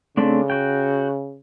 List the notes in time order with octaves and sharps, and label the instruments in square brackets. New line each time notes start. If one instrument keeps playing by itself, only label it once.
[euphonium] C#3 [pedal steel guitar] A3 C4 D4
[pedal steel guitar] F#4 G5